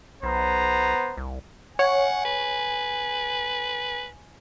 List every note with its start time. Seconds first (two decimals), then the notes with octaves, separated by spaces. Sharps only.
0.23 B1 B3 C5 A#5
1.17 C2
1.79 C#5 F#5 G#5
2.25 B4